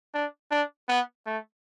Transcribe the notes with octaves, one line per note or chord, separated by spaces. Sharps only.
D4
D4
B3
A3